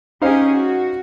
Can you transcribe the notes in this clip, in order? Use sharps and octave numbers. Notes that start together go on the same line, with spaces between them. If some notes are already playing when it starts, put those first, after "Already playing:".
C#4 D#4 G4 G#4 C5 F5
F#4